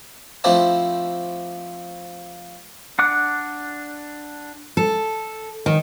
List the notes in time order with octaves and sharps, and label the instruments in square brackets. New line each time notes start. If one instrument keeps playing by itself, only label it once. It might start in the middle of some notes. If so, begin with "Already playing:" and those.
[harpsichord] F3 A3 C4 D4 E4
[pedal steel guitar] D4 F#5 D6 F#6
[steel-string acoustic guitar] A4
D#3